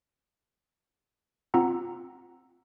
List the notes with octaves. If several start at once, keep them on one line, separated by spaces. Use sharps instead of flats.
C4 F4 F#5 A#5 E6